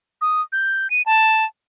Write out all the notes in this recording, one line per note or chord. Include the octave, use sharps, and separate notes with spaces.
D#6
G6
D#7
A5